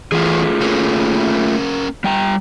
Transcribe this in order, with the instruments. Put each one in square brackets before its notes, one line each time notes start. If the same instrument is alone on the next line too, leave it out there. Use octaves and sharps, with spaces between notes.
[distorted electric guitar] E2 [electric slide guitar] A3 F4 G#4
[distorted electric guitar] A#3 C#4
[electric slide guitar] G3 G5 A#5